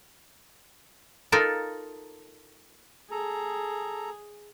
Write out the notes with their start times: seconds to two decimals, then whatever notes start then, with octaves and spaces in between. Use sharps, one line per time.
1.32 D#4 F4 A4 A#4
3.11 G#4 A4 A#5